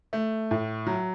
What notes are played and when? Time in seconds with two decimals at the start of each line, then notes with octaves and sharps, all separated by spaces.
0.13 A3
0.51 A2
0.87 F#3